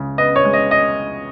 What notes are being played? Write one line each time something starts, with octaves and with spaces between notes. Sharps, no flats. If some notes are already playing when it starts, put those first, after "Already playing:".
Already playing: C#2 C#3 G#3
B3 D#5
C#5
G#3
D#5
D#5